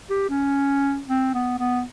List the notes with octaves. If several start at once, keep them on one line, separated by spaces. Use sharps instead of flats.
G4
C#4
C4
B3
B3